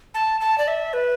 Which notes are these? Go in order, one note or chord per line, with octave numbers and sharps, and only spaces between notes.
A5
A5
D5
E5
B4